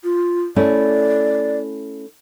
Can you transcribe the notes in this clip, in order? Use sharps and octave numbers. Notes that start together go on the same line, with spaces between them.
F4
A3 C#4 E4 D5